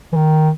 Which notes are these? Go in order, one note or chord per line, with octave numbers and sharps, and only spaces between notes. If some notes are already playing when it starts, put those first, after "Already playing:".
E3
D#3